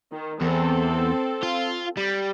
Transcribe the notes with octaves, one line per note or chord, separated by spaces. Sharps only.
D#3
E2 C4 A4
F4
G3